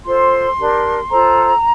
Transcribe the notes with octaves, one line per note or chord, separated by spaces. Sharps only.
F4 A4 C5 C6
D4 G4 A#4
F4 A4 C5 A#5